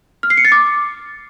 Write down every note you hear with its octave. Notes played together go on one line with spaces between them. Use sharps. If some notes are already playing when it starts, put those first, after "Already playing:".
F6
C7
C#7
A6
D6